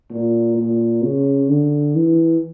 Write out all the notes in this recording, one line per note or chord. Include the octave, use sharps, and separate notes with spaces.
A#2
A#2
C#3
D3
E3